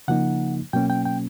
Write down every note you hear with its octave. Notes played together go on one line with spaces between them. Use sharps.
C#3 F3 A#3 D#4 F#5
B2 F#3 A#3 C#4 G5
G5
G5